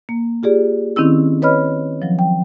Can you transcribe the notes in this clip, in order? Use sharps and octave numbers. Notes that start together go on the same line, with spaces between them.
A#3
F4 G4 G#4 D5
D#3 C4 C#4 E4 E6
B4 C#5 D#5 B5 F6
F3 F#3
G5